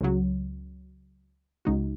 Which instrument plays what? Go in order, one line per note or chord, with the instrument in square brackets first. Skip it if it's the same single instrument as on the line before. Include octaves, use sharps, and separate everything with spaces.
[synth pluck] C#2 C#3 F#3
C#2 C#3 G#3 D#4 F#4